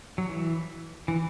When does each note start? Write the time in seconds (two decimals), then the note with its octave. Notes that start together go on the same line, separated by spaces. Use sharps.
0.18 F#3
0.29 E3
1.08 E3